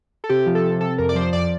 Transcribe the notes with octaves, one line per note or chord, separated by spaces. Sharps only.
A4
C3 G4
F3
A4
C3
C3 A4
F2 A#4
D5
F3 C5
F2 D5